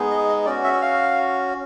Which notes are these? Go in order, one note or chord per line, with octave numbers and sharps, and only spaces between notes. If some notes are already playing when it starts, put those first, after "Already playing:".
Already playing: G#3 B3 D#4 G#4
D#5
D#5
C#4 F#4 D5
E5
F5